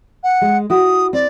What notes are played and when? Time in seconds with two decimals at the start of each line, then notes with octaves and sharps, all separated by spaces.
0.23 F#5
0.41 G#3
0.70 E4 F#4 D#6
1.13 C4 D5